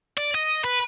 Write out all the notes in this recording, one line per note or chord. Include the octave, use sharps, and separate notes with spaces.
D5
D#5
B4